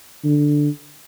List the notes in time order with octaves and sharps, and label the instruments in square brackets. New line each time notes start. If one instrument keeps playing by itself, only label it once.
[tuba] D3